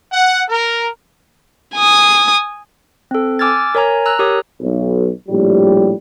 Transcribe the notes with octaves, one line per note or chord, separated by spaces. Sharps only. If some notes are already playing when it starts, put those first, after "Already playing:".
F#5
A#4
G#5 D#6
C4 A4
G#5 D6 E6 F6 G#6 A6
A#4 C#5 G#5 A#5
A#5 E6 F#6
G4 A#4 C#5 D#6
B1
A#1 A2 G3